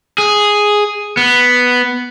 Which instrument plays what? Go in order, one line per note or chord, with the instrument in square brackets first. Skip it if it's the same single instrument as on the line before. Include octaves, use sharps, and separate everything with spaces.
[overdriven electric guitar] G#4
B3